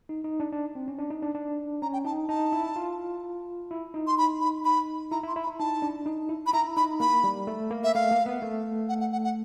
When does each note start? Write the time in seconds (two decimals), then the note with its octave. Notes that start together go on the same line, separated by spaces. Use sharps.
0.09 D#4
0.24 D#4
0.40 D4
0.53 D4
0.75 C4
0.88 C#4
0.99 D4
1.10 D#4
1.23 D4
1.35 D4
1.82 C#4 A#5
1.93 G5
2.05 D#4 A5
2.29 D#4 A5
2.53 E4
2.76 F4
3.71 E4
3.94 D#4
4.07 C6
4.18 B5
4.41 B5
4.65 B5
5.12 E4 A#5
5.23 E4
5.28 C6
5.36 E4
5.43 B5
5.47 E4
5.59 D#4 A5
5.82 D4
6.06 D#4
6.29 E4
6.46 B5
6.53 E4 A#5
6.77 D#4 B5
7.00 A#3 B5
7.24 G3
7.47 A3
7.71 A#3
7.84 E5
7.95 A3 F5
8.11 A#3
8.26 B3
8.42 A3
8.89 F#5
9.01 F#5
9.12 F#5
9.24 F#5